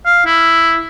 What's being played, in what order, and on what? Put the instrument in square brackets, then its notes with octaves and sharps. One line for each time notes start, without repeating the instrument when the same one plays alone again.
[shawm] F5
E4